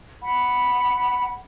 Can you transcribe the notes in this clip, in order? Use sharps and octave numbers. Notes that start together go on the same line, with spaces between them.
F#5 B5